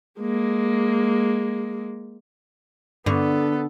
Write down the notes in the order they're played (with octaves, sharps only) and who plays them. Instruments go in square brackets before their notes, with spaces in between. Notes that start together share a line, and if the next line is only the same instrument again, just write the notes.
[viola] G#3 A#3
[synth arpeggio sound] G2 [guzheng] D3 [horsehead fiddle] B3 A4 [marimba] D4 C#6